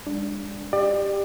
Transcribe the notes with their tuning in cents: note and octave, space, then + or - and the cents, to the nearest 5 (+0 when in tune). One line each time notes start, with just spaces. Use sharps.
G#3 -40 D4 +0
G4 +15 D5 +30